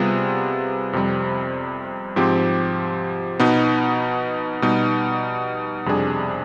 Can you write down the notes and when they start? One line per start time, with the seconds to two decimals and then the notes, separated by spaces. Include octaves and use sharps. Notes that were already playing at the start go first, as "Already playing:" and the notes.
Already playing: C3 G3 B3 F4 G#4
0.93 F2 C3 G3 C4
2.16 G#2 F3 C4 G4
3.40 B2 B3 D#4
4.62 B2 G3 B3 D#4
5.86 F2 C3 G3 D4 G#4